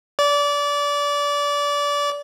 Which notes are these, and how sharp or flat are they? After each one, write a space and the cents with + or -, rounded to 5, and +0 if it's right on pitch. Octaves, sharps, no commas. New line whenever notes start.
D5 -25